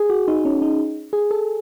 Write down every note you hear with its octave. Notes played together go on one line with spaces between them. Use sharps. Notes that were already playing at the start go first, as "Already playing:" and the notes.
Already playing: G#4
F#4
D#4
C#4
D#4
G#4
A4